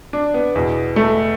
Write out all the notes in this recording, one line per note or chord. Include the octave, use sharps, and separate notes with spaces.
D4
B3
E2 B2
A3